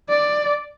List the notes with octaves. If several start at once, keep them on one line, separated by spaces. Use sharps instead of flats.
D5